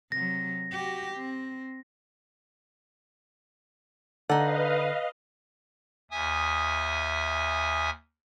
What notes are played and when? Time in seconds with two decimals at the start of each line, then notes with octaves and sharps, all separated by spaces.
0.12 C3 F#3 A#6
0.72 F#4 G4
1.16 C4
4.30 D3 D#4 A4 B4 D5 D#5 F5 F#5
6.11 D#2 E5 G#5 D#6